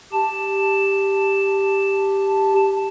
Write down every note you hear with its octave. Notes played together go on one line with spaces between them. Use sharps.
G4 A5